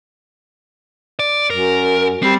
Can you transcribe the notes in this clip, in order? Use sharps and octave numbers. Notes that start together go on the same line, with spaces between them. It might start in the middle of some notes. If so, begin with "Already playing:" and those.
D5
F#2 A#4
G3 C4